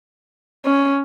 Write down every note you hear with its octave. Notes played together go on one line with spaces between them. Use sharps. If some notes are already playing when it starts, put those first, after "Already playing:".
C#4